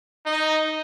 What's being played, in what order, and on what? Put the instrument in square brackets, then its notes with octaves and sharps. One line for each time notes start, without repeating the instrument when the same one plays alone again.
[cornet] D#4